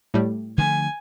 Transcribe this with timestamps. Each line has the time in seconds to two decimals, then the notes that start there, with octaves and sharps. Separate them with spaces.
0.14 A2 G3
0.58 D3 F3 A3 G#5